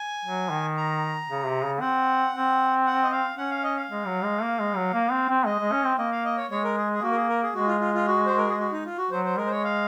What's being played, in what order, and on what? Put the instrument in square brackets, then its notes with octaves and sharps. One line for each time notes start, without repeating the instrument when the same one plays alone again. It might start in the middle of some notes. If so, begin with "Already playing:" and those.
Already playing: [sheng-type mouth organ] G#5
[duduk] F#3
D#3
[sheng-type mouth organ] A#5
[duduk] C#3
C3
C#3
[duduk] C4 [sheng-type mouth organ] F#5
[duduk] C4
[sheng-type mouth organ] F#5
D#5
F5
[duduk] C#4 [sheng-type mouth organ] F#5
[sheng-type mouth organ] F5
D#5
F5
[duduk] G#3
F#3
G#3
A#3
G#3
F#3
A#3
C4
C4
[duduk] G#3 [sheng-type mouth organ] D#5
[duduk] G#3
C#4
C4
[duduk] A#3 [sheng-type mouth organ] D#5
[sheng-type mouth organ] F5
D#5
C#5
[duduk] G#3 [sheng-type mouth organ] C#5
[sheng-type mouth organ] A#4
G#4
G#4
[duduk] A#3 [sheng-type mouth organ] F#4
[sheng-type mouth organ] A#4
G#4
A#4
G#4
[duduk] G#3 [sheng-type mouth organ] F#4
[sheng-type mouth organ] F4
F4
F4
F#4
C5
A#4
G#4
F#4
D#4
F4
F#4
[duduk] F#3 [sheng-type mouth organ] C5
[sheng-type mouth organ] C5
[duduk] G#3 [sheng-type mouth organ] A#4
[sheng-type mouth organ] C5
C#5
F5